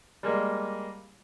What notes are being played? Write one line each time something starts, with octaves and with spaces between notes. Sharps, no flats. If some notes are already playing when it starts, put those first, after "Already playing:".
G3 G#3 A#3